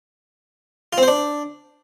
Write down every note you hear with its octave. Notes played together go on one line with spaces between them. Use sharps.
F4
C4
C5
D4